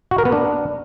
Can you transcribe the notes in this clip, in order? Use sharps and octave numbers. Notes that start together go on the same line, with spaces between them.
F#4
A#4
B3
D4